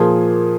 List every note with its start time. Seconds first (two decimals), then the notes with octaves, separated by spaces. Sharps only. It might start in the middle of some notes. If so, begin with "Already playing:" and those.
Already playing: A#2 F3 A#3 F4 G#4